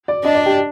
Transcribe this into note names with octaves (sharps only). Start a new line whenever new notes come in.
D5
D4 D#5
D5
G4